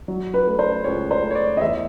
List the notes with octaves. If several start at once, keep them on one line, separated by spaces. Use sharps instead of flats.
F#3
B4
A3
C5
C#2 C#5
C5
A3
C#5
D5
D#5
E2 E5